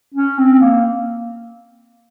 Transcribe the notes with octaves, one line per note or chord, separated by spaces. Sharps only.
C#4
C4
A#3